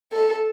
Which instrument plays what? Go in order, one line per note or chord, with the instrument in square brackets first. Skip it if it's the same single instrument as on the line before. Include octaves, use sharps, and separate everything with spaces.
[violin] A4